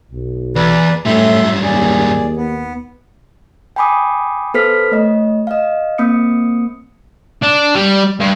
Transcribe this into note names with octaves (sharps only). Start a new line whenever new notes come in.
B1
E2 B4 D5
F#2 A2 G3 E5 C6
D#2 G#4 D5
B3
G5 G#5 B5 D6 D#6
B3 A4 B4 C5 F6 B6
A3 C#5 D#5
D#5 F5
A#3 C4 D#6 C#7
D4
G3
G2